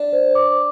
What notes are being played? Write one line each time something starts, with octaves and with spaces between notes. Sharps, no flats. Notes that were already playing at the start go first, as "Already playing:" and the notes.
Already playing: D4
C5
D6